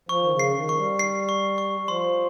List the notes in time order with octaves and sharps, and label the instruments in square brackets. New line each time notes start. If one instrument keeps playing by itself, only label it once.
[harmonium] F3 [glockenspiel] C#6
[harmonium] D#3
C#3
[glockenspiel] C7
[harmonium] D#3
[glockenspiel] C#6
[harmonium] G3
[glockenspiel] C7
C#6
C#6
[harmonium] F3 [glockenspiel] C6